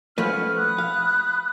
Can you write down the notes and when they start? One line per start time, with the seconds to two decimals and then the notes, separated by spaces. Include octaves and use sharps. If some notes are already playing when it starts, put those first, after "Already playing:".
0.18 F3 A3 C#4 B4 F#5 F6
0.56 B5 D#6 F#6
0.78 F5